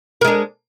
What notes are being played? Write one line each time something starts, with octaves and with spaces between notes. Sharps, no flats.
G#3 D4 A#4